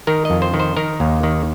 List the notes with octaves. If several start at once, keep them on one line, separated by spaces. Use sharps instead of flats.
D#3 A#4
F2 D#5
C5
D#3
C5
D#3 A#4
D#2
D#3